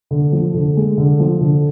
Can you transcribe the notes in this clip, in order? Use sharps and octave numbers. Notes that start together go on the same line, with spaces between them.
D3
F3
D3
G#3
D3
F3
D3